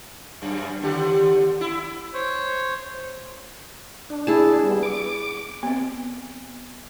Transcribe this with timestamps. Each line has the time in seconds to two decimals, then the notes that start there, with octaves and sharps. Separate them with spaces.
0.42 F#2
0.82 D#2 D3 G4
1.61 E4
2.14 C5 C#5
4.10 D4
4.27 E4 G#4 A5
4.63 G3 B3
4.83 D6
5.63 B3 C4